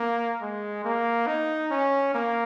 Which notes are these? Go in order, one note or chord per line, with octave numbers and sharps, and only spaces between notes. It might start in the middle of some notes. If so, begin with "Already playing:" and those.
Already playing: A#3
G#3
A#3
D#4
C#4
A#3